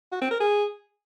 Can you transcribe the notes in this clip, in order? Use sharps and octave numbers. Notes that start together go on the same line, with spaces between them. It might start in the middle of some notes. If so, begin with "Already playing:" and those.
F#4
C4
A#4
G#4